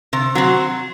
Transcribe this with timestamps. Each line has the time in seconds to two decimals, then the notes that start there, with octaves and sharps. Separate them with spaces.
0.13 C3
0.35 F#3 C4